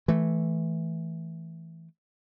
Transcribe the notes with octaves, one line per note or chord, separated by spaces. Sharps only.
E3 A3